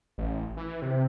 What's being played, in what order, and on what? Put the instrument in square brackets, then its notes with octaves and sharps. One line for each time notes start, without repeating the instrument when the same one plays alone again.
[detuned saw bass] A1
E3
C3